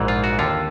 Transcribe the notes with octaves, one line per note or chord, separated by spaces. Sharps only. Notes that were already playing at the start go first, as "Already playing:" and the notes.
Already playing: A#1 G#2 E3
F4
F#4
D#2 D3 F4